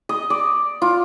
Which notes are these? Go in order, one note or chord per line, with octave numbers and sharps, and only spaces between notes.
D#5
D5
F4